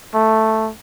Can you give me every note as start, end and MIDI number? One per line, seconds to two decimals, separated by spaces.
0.15 0.71 57